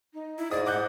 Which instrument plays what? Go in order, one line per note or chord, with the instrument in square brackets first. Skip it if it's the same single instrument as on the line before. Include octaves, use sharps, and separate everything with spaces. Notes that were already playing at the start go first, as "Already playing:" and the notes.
[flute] D#4
[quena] E4
[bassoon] G#2 [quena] D5 [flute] D#5 [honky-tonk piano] D#6
[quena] F#5 [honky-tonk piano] D6 F#6 G6